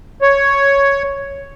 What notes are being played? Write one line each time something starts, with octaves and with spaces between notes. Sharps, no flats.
C#5